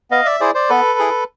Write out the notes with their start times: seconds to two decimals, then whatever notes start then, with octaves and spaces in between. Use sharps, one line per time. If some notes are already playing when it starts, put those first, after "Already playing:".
0.11 B3 D#5 F5
0.25 D5 E5
0.40 E4 G#4 C5 D5
0.54 C5 D5
0.69 B3 A4 B4
0.99 E4 G#4